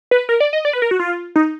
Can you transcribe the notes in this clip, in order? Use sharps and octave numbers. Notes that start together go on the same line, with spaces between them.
B4
A#4
D5
D#5
D5
B4
A#4
F#4
F4
D#4